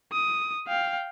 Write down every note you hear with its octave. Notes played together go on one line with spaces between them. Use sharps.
D#6
F5 G5